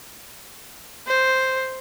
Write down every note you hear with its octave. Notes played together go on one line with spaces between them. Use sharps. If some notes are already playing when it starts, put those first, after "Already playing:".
C5